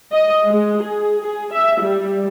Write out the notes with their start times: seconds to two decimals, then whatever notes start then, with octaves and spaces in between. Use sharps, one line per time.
0.12 D#5
0.46 G#3
0.82 G#4
1.20 G#4
1.53 E5
1.82 G3